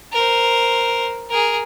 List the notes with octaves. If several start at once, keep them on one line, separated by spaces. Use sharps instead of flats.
A#4 C5
G#4 A#4